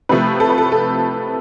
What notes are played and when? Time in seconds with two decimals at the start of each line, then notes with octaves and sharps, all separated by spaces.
0.09 C3 F3 A3 B4
0.40 A4
0.50 B4
0.58 A4
0.72 A4